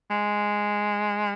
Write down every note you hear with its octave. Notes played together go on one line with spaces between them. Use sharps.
G#3